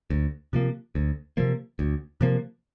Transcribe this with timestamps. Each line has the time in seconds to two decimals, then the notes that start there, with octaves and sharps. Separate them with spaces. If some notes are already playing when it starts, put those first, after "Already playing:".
0.10 D2
0.53 C3 F3 A#3
0.95 D2
1.37 C3 F3 A#3
1.79 D2
2.21 C3 F3 A#3